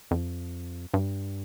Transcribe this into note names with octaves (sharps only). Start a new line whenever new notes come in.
F2
G2